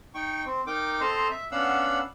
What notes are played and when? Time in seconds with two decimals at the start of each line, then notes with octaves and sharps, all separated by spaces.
0.15 D#4 G5 C#6
0.46 C4
0.67 D#4 A#4 G5 D6
1.01 C4 A4 C5 D#5 A#5 C6
1.31 E5
1.52 B3 C#4 D4 F5 F#5 E6